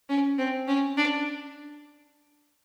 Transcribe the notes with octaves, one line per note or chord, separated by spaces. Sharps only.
C#4
C4
C#4
D4